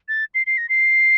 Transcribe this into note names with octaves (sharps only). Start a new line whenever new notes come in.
A6
C7
C7
A#6
C7